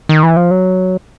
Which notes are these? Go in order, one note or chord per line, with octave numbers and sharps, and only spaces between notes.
D#3
E3
F3
F#3